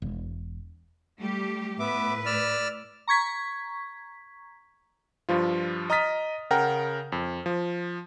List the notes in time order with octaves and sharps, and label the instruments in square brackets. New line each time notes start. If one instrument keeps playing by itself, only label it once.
[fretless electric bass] E1
[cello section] G3 A3 G4
[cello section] A2 B4 [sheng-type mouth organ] B3 E5 D6
[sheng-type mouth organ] D5 E6 F6
[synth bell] A#5 C#6 G#6 B6
[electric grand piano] G2 F3 F4
D#5 A#5 D#6 F6 A6 B6
C#3 A#4 F#5 G5 A#5 F6
F2
F3